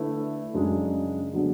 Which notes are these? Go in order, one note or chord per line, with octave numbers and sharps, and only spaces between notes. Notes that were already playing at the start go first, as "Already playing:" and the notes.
Already playing: D3 A3 E4 B4 E5
F#2 C#3 G#3 D4 G#4
D3 F#3 B3 D4 G#4